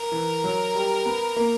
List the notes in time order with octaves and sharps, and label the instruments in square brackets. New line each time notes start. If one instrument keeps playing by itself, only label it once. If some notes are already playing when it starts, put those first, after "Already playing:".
Already playing: [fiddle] A#4
[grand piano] E3
F#3
G3
B3
A#3